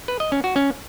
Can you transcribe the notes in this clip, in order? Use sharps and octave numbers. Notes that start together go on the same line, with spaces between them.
B4
D#5
C#4
F#4
C#4